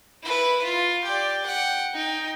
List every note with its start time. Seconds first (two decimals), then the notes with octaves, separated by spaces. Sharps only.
0.23 E4 B4
0.64 F4
1.04 G4 D5
1.45 F#5 G5
1.93 D#4 G5